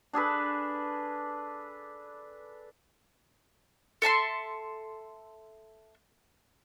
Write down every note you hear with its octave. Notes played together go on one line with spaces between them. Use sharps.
D4 G#4 A4 B4
A4 E5 A5 C6